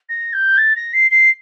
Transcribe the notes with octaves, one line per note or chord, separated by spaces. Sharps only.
A#6
G6
A6
A#6
C7
C7